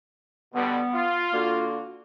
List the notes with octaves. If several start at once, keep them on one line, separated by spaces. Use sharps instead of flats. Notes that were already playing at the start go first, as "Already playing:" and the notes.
B2 D3 G3 B3
F4
D3 A#3 F#4